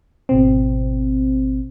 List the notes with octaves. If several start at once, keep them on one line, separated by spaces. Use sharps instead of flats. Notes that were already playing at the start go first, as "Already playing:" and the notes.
G#1 B2 C4